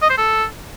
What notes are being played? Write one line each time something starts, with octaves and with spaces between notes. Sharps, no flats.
D#5
C5
A4